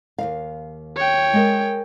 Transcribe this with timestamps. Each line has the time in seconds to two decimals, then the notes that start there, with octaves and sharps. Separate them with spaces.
0.18 D#2 D#3 F5
0.96 C#5 G5
1.33 G#3 A#4